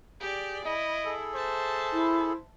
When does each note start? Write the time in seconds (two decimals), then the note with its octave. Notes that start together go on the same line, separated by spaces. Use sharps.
0.21 G4 G#4 D5
0.66 E4 D#5
1.05 G#4 A4
1.35 C5 E5 A5
1.93 E4